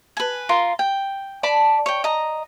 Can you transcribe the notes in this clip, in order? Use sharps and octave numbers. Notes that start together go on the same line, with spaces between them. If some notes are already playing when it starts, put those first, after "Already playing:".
B4 G#5
F4 A#4 C6
G5
D5 A5 B5
C#5 G5
D#5 A#5